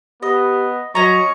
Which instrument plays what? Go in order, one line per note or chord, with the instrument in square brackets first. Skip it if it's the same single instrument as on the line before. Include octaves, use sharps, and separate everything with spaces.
[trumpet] B3 [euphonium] G4 [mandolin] D#5
[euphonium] F#3 [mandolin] C#4 A#5 [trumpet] D#5 [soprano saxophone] C#6